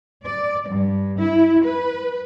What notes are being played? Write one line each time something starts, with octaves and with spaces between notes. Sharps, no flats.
D5
G2
E4
B4